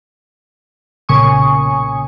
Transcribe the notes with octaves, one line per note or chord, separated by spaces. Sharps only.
B1 A#2 C#3 G#5 C#6 D#6